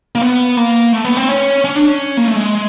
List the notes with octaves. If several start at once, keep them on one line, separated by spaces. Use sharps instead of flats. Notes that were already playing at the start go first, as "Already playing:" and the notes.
A#3
B3
A#3
A3
B3
C4
C#4
C#4
D4
C#4
A#3
A3
G#3